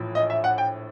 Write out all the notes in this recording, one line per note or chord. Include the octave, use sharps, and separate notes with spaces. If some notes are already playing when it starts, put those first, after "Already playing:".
Already playing: A#1 A2 E3
D#5
E5
F#5
G5